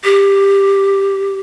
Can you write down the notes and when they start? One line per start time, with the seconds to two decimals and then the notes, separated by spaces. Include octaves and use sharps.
0.04 G4